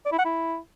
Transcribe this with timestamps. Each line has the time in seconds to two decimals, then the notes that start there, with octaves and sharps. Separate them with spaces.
0.06 D5
0.12 E4
0.19 F#5
0.25 E4